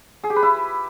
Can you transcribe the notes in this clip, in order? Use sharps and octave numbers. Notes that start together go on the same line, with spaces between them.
G#4
G4
B4
E4